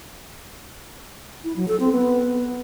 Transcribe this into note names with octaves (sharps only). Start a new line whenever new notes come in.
E4
F#3
A4
C4
B3